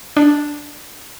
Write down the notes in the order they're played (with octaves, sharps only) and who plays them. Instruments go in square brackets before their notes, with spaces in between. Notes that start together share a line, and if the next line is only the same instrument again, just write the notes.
[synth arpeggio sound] D4